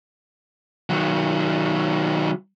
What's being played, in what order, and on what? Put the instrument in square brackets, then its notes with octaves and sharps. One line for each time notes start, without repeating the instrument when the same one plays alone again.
[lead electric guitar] D#3 F#3